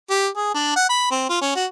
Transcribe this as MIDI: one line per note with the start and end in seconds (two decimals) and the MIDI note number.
0.10 0.28 67
0.36 0.49 68
0.54 0.74 62
0.76 0.87 78
0.89 1.07 83
1.11 1.27 60
1.29 1.40 65
1.41 1.54 61
1.56 1.66 66